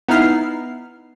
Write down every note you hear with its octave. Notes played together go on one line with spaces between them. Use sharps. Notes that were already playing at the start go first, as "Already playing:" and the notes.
B3 D#4 E4 F6 C7